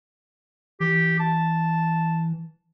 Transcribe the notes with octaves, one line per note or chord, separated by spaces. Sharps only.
E3 G4
A5